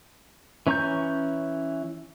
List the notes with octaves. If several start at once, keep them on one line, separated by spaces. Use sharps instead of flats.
E3 C#4 A#5 C#6 G6